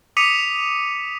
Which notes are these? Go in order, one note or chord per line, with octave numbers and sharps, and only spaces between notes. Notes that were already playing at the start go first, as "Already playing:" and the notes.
D6 D#6 B6 C#7 D#7 F7